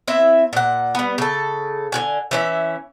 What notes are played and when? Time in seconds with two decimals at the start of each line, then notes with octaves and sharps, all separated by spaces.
0.08 C4 E4 E5
0.53 A#2 F#5
0.95 G3 B3
1.18 C#3 A4
1.92 D3 F#4 G#5
2.31 E3 C#4 E5